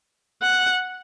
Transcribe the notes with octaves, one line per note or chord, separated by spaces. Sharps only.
F#5